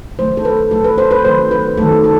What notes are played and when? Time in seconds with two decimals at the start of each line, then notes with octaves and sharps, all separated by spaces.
0.19 D#3 F#3 A3 C5
0.37 A4
0.45 B4
0.71 D#3 F#3 A3 A4
0.84 B4
0.98 C5
1.11 B4
1.24 D#3 F#3 A3 C5
1.51 B4
1.77 D#3 F#3 A3 A4
2.04 A4